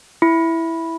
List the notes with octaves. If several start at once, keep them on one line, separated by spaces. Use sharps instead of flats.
E4